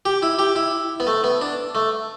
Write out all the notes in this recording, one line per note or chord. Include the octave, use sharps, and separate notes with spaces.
G4
E4
G4
E4
B3
A3
B3
D4
A3